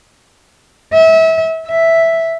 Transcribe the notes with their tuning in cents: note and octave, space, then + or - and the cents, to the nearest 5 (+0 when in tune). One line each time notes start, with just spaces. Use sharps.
E5 -30
E5 +0